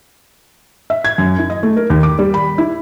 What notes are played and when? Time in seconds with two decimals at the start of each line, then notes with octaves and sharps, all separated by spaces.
0.90 E5
1.05 G#6
1.18 F#2
1.39 E4
1.50 D#5
1.63 A3
1.77 A#4
1.90 D#2
2.03 D6
2.19 G3
2.34 B5
2.58 E4